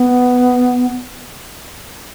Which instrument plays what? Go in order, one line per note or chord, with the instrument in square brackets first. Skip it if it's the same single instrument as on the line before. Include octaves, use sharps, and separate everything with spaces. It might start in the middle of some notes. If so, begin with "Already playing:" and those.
Already playing: [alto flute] B3